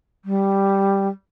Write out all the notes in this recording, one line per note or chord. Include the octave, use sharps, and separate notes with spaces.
G3